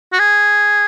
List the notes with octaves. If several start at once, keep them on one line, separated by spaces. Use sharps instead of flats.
F#4
G#4